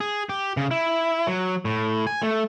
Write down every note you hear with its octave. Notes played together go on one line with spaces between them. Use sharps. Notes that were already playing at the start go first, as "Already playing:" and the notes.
G#4
G4
C#3
E4
F#3
A2
G#5
A3